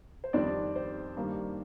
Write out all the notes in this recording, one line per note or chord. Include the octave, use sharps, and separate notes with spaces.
C5
F2 D#3 G3 C4 D4 D5
C5
G2 D#3 G3 A#3